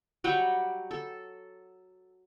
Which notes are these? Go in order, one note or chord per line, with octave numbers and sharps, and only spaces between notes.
F#3 G3 F#5 G5
A4